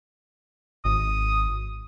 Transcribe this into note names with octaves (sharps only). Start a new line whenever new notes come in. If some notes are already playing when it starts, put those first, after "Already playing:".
G#1 D#6